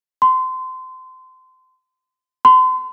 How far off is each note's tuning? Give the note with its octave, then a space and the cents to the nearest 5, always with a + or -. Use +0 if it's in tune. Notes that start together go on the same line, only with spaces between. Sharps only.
C6 -25
C6 -40